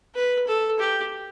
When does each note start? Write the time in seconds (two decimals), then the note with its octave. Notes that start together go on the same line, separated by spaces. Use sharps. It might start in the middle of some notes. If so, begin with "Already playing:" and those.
0.15 B4
0.47 A4
0.79 G4